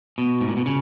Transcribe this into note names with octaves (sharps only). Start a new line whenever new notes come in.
B2
G#2
A#2
B2
C#3